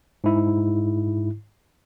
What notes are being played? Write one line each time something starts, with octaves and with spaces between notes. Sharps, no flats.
G#2 E4